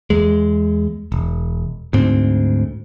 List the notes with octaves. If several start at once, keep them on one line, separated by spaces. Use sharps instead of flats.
E2 G#3
E1
D2 G#2 C4